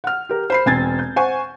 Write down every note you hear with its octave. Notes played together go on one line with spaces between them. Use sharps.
F#5 F6
G4 A#4
C5 B5 C7
E1 C4 G#5 G#6 A6
G6
C5 F#5 G#5 C#6